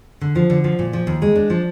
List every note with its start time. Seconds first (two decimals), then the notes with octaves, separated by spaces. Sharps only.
0.21 D3
0.36 F3
0.50 D3
0.64 F3
0.79 A#2
0.93 F3
1.07 D#2
1.22 G#3
1.35 D4
1.50 F3